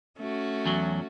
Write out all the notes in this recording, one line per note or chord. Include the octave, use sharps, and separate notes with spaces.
A3 C#4 F#4
E2 F#3